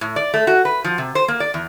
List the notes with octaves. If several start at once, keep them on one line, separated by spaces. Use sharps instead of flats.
A2
D5
A3
F#4
B4
F3
C3
C5
A#3
D5
E2